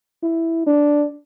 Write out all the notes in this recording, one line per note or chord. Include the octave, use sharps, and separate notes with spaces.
E4
D4